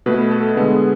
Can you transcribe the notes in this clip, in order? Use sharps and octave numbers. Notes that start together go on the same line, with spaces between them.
B2 A3 B4
A4
D3 G#3 B3 B4
G#4